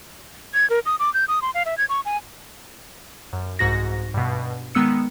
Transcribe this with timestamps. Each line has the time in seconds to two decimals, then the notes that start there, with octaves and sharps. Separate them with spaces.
0.54 G#6
0.70 A#4
0.86 D#6
0.99 D6
1.14 G6
1.28 D#6
1.42 C6
1.54 F5
1.66 E5
1.78 G#6
1.89 C#6
2.05 G#5
3.33 F#2
3.59 C2 G#2 F#4 A#6
4.14 G2 B2
4.75 D#3 G#3 B3 E6 C#7